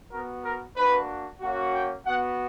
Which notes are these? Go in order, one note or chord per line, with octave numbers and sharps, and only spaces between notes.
B3 F#4 A#4
A#4
A#3 D4 F#4 B4
A#3 C#4 F#4
G5
B3 F#4 F#5